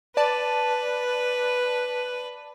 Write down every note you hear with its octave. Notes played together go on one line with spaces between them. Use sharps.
B4 D5 A5